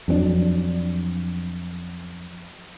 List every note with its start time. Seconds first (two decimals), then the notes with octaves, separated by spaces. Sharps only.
0.08 F2 F#3 C4 D4